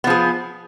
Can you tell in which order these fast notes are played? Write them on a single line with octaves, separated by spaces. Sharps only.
B3 F3 G#4